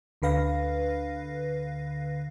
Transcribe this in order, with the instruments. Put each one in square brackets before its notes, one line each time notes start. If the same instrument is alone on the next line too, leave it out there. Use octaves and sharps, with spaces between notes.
[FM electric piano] D2 D3 B4 F5 A#6